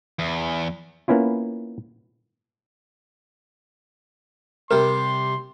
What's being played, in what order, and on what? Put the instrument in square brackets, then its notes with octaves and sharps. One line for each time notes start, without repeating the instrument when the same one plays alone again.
[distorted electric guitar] E2
[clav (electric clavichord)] A#3 B3 C#4 E4 F4
[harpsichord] C3 G3 [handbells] A#4 [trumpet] C6